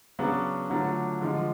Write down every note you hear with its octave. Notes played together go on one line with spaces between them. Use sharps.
C#3 F#3 B3 D4
D3 F#3 A3 D4 F4
D3 F3 G#3